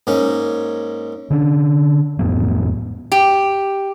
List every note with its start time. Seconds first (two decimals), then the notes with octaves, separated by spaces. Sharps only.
0.07 G#2 A#3 C#4
1.30 D3 C#4 D4
2.19 F2 A2 F#3 B3
3.12 G4